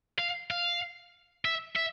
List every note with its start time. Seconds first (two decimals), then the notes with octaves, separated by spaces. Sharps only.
0.19 F5
0.51 F5
1.45 E5
1.76 E5